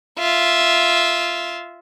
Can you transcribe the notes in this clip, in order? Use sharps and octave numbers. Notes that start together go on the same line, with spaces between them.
F4 E5